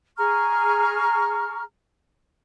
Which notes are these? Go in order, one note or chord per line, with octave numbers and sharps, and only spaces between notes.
G#4 A#5 C#6 F6